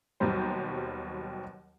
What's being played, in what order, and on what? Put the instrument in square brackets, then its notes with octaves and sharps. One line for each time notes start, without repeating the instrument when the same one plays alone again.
[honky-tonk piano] D#2 B2 F#3 G3 C5